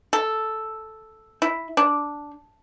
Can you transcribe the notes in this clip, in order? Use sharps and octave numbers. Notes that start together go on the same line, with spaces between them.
A4
E4
D4